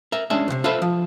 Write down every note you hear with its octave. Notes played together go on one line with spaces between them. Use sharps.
A#4 E5
G#3 C#4 D4 E5
E2 C3
F4 A4 B4 C5 E5
F3